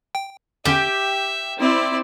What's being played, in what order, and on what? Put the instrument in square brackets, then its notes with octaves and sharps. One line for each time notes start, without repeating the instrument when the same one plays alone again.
[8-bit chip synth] G5
[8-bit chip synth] E2 D3 C#4 [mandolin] G4 [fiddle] E5
[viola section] C4 E4 [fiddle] D5